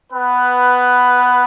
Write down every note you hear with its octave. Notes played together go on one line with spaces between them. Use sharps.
B3 B4